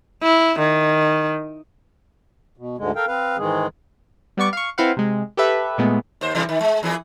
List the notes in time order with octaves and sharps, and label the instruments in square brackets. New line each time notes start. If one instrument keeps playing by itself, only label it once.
[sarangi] E4
D#3
[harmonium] B2
D2 G#2 D3 G#3
A4 A#4 F5 G5
C4 B4 F5
G#2 D#3 E3 G#3 G#4
[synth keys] G3 B3 D5 C#6 D6
F5 C#6
C4 E4 B4 F5 F#5
C3 G#3
G4 A4 B4 E5
A#2 G#3 A3 B3
[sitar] D#2 C5
C3 E3 G3
D#3
G#3
E2 E3 G#4